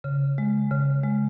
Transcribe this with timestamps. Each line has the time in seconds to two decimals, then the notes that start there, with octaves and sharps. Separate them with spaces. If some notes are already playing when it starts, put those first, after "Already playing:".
0.04 C#3
0.38 G#3
0.71 C#3
1.04 G#3